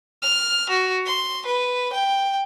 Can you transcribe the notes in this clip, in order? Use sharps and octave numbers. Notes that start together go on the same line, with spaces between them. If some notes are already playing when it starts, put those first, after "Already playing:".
F6
F#4
C6
B4
G5